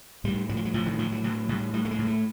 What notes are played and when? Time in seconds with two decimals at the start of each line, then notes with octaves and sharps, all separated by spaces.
0.24 A2 G3
0.49 A2 F#3
0.57 F3
0.65 F#3
0.74 A2 F3
0.86 D#3
0.98 A2 F3
1.12 F#3
1.24 A2 F#3
1.49 A2 G3
1.73 A2 G3
1.85 A3
1.91 G#3
1.99 A2
2.07 A3